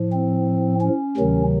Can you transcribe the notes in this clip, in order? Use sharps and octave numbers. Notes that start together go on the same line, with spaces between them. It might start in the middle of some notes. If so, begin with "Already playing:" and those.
Already playing: A2 F3
C4
C#4
D2 C3 D#3 F#3